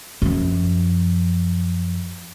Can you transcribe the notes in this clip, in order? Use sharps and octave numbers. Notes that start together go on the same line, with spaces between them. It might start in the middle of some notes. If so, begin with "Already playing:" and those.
F#2 F3